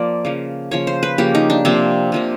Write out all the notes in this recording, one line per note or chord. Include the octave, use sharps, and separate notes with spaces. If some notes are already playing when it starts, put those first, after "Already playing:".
Already playing: F3 A#3 D5
C#3 F3 A#3
C#3 F3 A#3 C#5
C5
B4
C#3 F3 A#3 G4
D#4
D4
C3 F3 A#3 C4
C3 F3 A#3